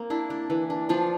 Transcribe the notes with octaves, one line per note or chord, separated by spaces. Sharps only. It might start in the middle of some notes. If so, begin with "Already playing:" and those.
Already playing: A#3 C4
D4 E4
D4
E3
D4
F3 D4 F4